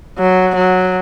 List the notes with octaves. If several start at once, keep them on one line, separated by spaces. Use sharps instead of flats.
F#3
F#3